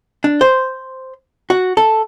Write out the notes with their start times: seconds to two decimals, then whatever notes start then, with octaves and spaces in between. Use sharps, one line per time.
0.24 D4
0.41 C5
1.50 F#4
1.77 A4